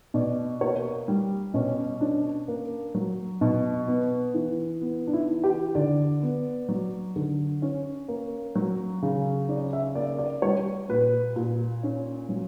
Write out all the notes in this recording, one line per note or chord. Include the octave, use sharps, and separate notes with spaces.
B2 D5
A#3 C#5
G3
B2 C#4
C#4 D4
A#3
F#3
B2
B3
E3
B3
D4
E4
E3
G4
D3 D5
B3
F#3
D3
C#4
A#3
F#3
C#3
C#4 D5
E5
A#3 D5
D5
G3 C#5
A#2 B4
A#2
C#4
F#3